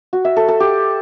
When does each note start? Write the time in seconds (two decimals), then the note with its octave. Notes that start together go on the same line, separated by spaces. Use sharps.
0.13 F#4
0.25 E5
0.37 A4
0.48 A4
0.60 G4